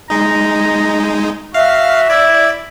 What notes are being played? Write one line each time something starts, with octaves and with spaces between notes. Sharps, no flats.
G#3 D#4 A#5
F#4 E5 F5
E4 D5